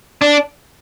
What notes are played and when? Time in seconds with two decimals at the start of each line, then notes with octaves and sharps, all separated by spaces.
0.21 D4